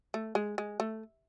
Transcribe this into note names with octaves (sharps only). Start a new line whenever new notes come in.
A3
G#3
G#3
A3